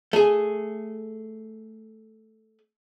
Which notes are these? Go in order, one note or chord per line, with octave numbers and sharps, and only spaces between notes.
A3 G#4